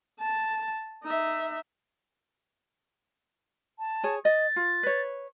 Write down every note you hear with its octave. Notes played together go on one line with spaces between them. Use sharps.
A5
D#4 E5
A5
G#4 C#5
D#5 A6
F4
B4 C#5